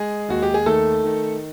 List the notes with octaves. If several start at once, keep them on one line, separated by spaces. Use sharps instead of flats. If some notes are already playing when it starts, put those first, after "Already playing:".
Already playing: G#3 G#4
D#2 F#4
G4
G#4
D#3 A3 A4
D#3